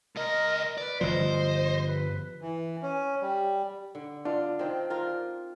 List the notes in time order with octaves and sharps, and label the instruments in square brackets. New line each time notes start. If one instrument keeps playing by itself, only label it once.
[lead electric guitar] C#2 D#5 [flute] A#4
[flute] B4 [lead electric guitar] D5
[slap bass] G1 F3 [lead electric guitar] C5 [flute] D#5
[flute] B4
[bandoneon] E3
C#4
G3
[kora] D3
[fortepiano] D4 [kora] F4
[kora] D#3 C4
F4 A#4